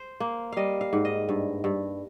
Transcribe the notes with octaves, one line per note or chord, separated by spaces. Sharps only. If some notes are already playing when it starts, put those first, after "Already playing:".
Already playing: C5
A#3
G3 D#5 F5
F5
G#2
D#5
G2
G2